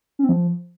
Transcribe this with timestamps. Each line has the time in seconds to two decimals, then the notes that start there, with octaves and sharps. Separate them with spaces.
0.19 C#4
0.24 C4
0.29 F3